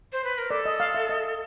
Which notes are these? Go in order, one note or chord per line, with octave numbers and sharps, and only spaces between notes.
C5
B4
A#4
A4 D5
D#5
F5
E5
D#5